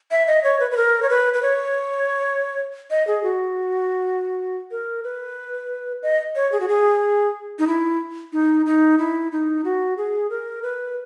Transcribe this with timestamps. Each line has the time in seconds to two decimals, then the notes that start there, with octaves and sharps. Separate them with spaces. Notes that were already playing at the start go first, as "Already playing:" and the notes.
0.11 E5
0.27 D#5
0.44 C#5
0.60 B4
0.71 B4
0.77 A#4
1.02 C#5
1.10 B4
1.34 B4
1.42 C#5
2.90 D#5
3.07 G#4
3.23 F#4
4.71 A#4
5.04 B4
6.03 D#5
6.35 C#5
6.52 G#4
6.60 F#4
6.68 G#4
7.59 D#4
7.67 E4
8.33 D#4
8.66 D#4
8.99 E4
9.32 D#4
9.65 F#4
9.97 G#4
10.30 A#4
10.63 B4